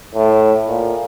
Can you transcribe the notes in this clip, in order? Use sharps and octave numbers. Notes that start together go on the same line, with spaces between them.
A2
A#2